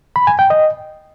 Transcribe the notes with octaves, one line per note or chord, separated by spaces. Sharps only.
B5
G#5
G5
D#5